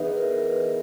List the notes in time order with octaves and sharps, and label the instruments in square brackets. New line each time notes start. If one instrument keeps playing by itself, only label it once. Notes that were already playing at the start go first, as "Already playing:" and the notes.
Already playing: [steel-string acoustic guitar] E3 B3 D#4 G#4 [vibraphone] B4 D#5 E5
[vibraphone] A#4
A#4
B4